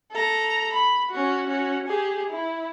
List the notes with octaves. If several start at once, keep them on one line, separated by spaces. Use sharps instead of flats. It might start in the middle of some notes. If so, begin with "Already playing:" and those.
A4 A#5
B5
C#4 F#4
C#4 F#4
G4 G#4
E4